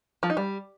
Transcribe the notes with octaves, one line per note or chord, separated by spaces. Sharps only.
F3
D#4
G3